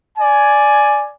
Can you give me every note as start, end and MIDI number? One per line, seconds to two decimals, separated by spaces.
0.18 1.11 74
0.18 1.11 80